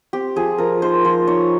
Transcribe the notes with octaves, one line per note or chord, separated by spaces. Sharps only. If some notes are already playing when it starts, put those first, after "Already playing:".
C4 G4
F3 G#4
F3 A#4
D#4 C5
F3 C5
D#4 C#5